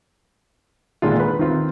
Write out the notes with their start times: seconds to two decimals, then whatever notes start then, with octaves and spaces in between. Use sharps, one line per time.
1.02 A#2 D3 D#3 G#3 D4 F4
1.19 B4 B5
1.39 D#3 C4 F4